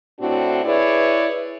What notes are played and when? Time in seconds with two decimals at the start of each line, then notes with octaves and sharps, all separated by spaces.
0.21 A2 C4 D4 E4 F#4
0.65 E4 G#4 B4 C#5 D5